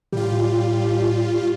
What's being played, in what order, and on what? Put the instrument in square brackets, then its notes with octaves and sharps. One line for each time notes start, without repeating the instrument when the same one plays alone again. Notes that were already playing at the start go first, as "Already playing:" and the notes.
[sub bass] A2 [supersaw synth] G3 F4 [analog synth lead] G4